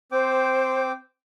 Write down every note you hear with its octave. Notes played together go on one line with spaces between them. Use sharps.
C4 C5 G5 D6